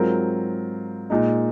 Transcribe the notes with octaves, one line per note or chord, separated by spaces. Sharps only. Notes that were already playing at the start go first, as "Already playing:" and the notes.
Already playing: G#2 F#3 C4 F4 A#4
A#2 G#3 D#4